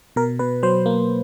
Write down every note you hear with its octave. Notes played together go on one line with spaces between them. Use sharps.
B2 A#4
B2 B4
F#3 C5
A#3